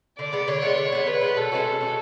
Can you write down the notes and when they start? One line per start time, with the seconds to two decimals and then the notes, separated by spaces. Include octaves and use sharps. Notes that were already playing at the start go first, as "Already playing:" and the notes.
0.18 D3 D5
0.33 G#3 B3
0.48 D3 C#5
0.62 G#3 B3
0.78 D3
0.92 G#3 B3
1.07 D3 B4
1.21 G#3 B3
1.37 B2 A4
1.52 G#3 C#4 F#4
1.67 B2
1.81 G#3 C#4 F#4